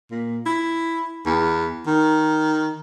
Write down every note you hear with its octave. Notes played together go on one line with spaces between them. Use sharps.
A#2
E4
E2
D#3